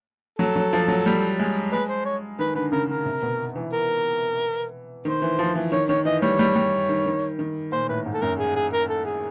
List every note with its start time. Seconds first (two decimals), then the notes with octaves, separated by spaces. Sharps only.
0.39 F#3 A4
0.56 F#3
0.73 F3
0.88 F#3
1.06 G3
1.39 G#3
1.72 G#3 B4
1.89 C5
2.05 C#5
2.39 D#3 B4
2.55 D3 B4
2.72 C#3 A#4
2.89 D3 A#4
3.05 C3
3.22 B2
3.56 E3
3.72 A#4
5.05 D#3 C5
5.22 E3
5.39 F3
5.55 E3
5.72 D#3 C#5
5.89 D#3 C#5
6.05 E3 D#5
6.22 G3 C#5
6.39 G3
6.56 G3
6.89 D#3
7.06 D#3
7.39 D#3
7.72 A#2 C5
7.89 A2 B4
8.06 G#2
8.14 A4
8.22 F#2 A#4
8.39 G#4
8.56 G#4
8.72 A#4
8.89 A4
9.05 G#4